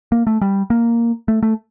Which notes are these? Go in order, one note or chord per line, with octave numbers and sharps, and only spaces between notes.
A#3
A3
G3
A#3
A3
A3